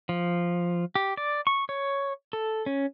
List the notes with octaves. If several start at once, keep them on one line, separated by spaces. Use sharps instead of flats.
F3
G4
D5
C#6
C#5
A4
C#4